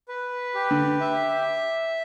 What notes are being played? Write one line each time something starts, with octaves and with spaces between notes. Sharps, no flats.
B4
G4
D3
E5